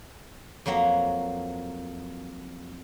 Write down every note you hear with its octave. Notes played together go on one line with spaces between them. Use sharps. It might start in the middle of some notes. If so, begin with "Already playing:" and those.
F2 F#3 A#3 F#4 A#5